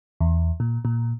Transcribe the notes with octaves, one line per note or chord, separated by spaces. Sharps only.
E2
A#2
A#2